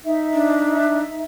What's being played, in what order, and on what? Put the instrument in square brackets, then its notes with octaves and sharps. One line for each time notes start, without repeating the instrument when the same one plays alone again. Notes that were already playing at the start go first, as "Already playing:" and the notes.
[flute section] D#4 E5
[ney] D4